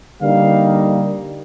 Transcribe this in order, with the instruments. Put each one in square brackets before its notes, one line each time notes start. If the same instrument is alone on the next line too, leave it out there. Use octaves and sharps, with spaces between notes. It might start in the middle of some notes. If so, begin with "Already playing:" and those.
[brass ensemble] D3 G3 A#3 D#4 F5